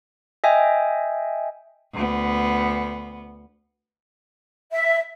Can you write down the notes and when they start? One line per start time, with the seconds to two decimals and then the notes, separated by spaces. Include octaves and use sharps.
0.44 D#5 E5 G5 G#5
1.94 D2 B3
4.72 E5